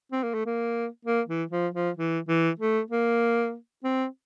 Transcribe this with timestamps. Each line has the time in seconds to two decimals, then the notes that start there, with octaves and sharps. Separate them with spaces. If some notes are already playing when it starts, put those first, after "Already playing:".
0.12 C4
0.23 A#3
0.34 A3
0.46 A#3
1.05 A#3
1.28 E3
1.51 F3
1.74 F3
1.97 E3
2.28 E3
2.59 A3
2.91 A#3
3.84 C4